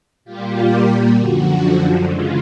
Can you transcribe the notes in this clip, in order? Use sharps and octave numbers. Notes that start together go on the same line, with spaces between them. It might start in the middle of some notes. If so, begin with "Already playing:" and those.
A#2 G3 A#3 F4 G4
F#2 D3 F3 F#4
C#3 E3 G#3 F4